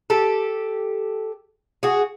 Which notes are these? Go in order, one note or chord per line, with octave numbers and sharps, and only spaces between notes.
G4 A4
F#4 G#4